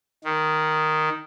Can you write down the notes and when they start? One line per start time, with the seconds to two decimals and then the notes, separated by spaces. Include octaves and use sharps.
0.24 D#3